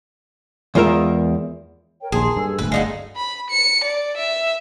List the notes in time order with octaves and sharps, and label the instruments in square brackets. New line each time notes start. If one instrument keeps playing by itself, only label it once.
[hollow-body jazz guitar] E2 G#3 F4 A#4 E5
[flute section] A#4 C#5 G5
[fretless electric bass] A#1 D#2 [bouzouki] G#4 [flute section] A5 A#5 C6
[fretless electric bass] G2 [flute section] A4 G#5 E6
[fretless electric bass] D1 G1 D2 [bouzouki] B4
[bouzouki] G#3 D#4 F#4 [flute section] D5 F5
[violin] B5
C#7
D5
E5